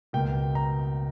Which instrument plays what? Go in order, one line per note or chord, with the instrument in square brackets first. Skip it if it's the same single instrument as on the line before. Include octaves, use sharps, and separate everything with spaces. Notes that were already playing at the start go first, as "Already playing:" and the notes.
[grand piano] C#2 B2 A#3 G5
A#5